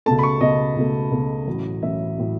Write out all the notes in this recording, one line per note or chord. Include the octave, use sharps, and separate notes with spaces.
C#2 B2 A3 A5
B5
C#6
C#2 B2 A3 D#5
C#2 B2 A3
C#2 B2 A3
A1 A2 F#3
A1 A2 F#3 E5
A2 F#3